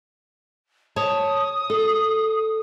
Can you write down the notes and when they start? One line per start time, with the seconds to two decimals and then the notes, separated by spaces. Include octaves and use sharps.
0.96 C#5 A5 D#6
1.70 A4